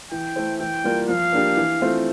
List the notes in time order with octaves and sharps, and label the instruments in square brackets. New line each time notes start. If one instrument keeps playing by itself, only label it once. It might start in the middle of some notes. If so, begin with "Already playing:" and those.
[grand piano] E3 [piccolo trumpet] G5
[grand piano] A3 E4 A4 C5
[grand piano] E3 [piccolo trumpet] G5
[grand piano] G3 A#3 F4 A#4
[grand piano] F3 [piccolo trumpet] F5
[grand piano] A#3 D4 G4
E3
A3 C4 F4